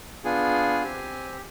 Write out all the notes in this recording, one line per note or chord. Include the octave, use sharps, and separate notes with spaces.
B3 D4 F4 G#4 G#5
C4 G4